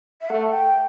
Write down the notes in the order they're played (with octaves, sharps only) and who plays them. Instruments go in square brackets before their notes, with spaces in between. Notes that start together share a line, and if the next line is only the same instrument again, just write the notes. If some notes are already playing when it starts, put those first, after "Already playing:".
[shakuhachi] E5
[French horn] A3 [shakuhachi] F#5
[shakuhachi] G5